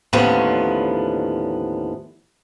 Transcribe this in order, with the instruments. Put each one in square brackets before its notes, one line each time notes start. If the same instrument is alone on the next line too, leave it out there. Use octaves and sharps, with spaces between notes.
[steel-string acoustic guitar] D#2 A2 D3 F3 B3 C#4